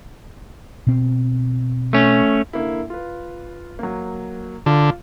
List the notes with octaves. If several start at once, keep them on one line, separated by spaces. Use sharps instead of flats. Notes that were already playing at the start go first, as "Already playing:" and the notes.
B2 C4
A3 C#4
D3 A#3 E4
F4 B4
F#3 A#3
D3 F4